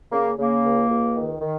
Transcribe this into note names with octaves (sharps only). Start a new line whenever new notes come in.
C#3 A#3
C#3 A#3
C#2
C#2
D#3
D#3